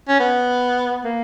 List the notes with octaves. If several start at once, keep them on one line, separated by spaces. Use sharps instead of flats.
C#4
B3
A#3